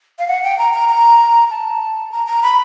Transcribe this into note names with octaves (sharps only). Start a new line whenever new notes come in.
F5
F#5
G5
A#5
A#5
A#5
A5
A#5
A#5
B5